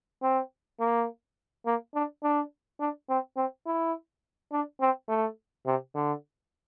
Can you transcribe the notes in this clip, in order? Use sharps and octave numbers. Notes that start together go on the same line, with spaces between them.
C4
A#3
A#3
D4
D4
D4
C4
C4
E4
D4
C4
A3
C3
D3